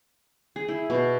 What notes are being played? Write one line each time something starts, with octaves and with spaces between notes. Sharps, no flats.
G#4
E4
B2